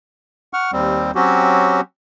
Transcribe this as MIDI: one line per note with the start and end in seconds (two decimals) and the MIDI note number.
0.53 0.71 78
0.53 0.71 85
0.53 0.71 89
0.73 1.11 39
0.73 1.11 55
0.73 1.11 60
1.15 1.81 54
1.15 1.81 60
1.15 1.81 61
1.15 1.81 66
1.15 1.81 67